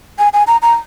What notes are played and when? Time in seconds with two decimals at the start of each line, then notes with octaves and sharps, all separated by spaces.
0.19 G#5
0.34 G#5
0.47 A#5
0.62 A#5